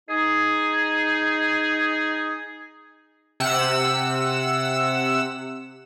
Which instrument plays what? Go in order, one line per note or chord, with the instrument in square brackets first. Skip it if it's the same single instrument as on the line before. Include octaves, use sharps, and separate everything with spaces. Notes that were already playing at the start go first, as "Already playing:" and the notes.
[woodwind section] D#4 G#4
[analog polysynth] C3 F#5 E6 E7